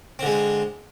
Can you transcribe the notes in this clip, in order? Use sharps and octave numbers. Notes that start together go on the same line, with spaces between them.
D3 G#3 C4